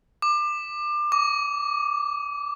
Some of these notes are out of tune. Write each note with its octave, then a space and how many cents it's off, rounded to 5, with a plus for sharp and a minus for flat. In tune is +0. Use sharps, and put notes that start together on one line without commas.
D6 +25
D6 -25